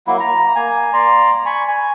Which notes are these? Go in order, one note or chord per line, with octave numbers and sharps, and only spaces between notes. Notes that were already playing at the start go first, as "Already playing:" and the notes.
F#3 A#3 E4
A#5
A#3 G#5
D5 A#5 C6
G#5 B5 C#6
G#5